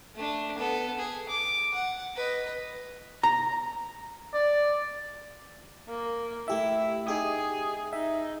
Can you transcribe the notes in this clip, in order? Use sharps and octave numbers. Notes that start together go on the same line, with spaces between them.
A3 D4
B3 A4
G#4
D6
F#5
B4 D#5
A#5
D5
A#3
A3 E4 G4 E5
D#4 G4 G#4 D#6
D#4 E5